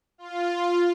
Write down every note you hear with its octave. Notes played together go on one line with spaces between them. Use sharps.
F4